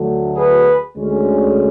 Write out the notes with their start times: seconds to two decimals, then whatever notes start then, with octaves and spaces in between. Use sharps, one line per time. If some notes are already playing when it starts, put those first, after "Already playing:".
Already playing: D2 D3 F#3 A3
0.37 G#4 B4
0.95 D2 D3 G#3 C#4